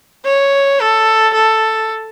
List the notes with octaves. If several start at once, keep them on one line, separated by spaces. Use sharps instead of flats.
C#5
A4
A4